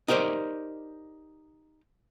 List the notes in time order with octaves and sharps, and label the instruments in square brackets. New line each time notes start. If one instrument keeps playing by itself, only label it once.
[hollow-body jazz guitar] D#4 G4 A#4 C5 D5